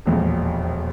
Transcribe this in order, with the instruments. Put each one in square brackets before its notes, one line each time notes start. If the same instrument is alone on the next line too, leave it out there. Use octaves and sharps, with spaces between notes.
[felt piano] E1 A#1 F2